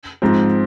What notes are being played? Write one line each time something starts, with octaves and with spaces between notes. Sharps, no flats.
G#2 F3 C4